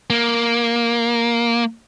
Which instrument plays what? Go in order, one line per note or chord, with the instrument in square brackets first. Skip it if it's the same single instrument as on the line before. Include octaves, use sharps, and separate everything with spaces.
[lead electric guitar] A#3